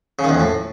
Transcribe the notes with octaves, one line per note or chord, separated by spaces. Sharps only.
C#3
D#3
E2
F2
A2